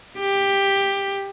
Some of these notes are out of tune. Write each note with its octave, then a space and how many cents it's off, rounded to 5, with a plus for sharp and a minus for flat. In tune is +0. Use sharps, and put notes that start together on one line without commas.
G4 +10